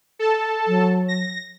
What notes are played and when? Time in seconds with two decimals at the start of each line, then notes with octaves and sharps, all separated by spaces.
0.19 A4 A5
0.68 F#3
1.08 A#6